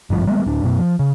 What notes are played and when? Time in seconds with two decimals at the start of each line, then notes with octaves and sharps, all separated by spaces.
0.10 G#1 G2 F3
0.27 G3 G#3 A#3 B3
0.46 D1 D4
0.63 F#2 B2
0.79 F3
0.99 C#3